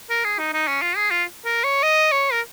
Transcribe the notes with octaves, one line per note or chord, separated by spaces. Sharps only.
A#4
G#4
D#4
D#4
C#4
F4
G#4
F4
A#4
C#5
D#5
C#5
A#4